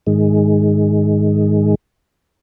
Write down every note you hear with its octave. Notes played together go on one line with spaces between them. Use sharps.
G#2 D#3 G#3